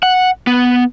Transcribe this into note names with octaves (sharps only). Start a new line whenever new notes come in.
F#5
B3